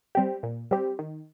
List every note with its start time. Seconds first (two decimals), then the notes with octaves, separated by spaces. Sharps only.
0.15 G3 C4 G4
0.43 A#2
0.71 G3 C4 G4
0.99 D#3